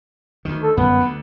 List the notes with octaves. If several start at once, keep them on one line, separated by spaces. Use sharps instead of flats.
D2 D#3
A4
G1 F#2 A#3 B3
D2 D3